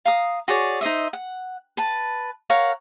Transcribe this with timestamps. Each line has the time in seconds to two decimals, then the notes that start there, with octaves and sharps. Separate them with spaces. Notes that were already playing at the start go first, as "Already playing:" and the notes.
0.05 F5 A#5 D#6
0.48 F#4 G#4 C#5 D5
0.81 D#4 C5 D#5 E5
1.13 F#5
1.77 B4 A5
2.50 A#4 C#5 F5 F#5